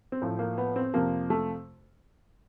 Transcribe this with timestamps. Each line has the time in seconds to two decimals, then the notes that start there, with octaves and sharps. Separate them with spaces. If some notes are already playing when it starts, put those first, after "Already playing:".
0.12 C4
0.22 A2 F3
0.39 A#3
0.58 B3
0.76 C4
0.94 F2 C3 F3 A#3
1.30 A3